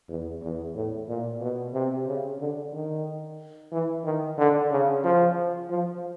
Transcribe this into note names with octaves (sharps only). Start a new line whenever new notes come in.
E2
E2
A2
A#2
B2
C3
C#3
D3
D#3
E3
D#3
D3
C#3
F3
F3